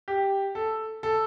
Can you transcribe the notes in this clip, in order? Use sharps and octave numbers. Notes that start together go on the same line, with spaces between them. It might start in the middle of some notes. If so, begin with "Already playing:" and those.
G4
A4
A4